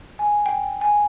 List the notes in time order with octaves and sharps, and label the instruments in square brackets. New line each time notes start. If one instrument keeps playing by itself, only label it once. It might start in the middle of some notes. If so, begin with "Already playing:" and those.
[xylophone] G#5
G5
G#5